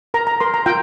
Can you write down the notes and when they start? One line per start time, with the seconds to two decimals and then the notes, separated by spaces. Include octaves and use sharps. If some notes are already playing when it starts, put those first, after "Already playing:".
0.14 A#4 A#5
0.27 A#5
0.40 A#4 C6
0.54 A#5
0.66 F4 G5